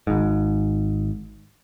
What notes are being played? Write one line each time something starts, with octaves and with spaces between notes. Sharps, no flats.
G#1 G#2